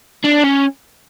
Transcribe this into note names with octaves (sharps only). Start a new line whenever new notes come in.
D4
C#4